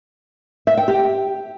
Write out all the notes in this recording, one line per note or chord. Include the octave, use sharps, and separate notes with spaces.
E5
G5
G4